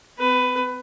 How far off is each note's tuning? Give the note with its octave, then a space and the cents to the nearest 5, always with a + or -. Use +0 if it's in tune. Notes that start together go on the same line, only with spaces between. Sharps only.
C4 -45 B4 +15